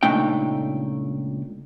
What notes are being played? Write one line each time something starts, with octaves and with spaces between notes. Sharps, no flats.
C#2 A#2 A3 D4 D#4 G5